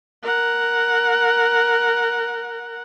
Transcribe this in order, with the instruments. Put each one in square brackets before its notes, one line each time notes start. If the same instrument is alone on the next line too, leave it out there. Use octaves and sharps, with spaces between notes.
[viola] A#4 F#5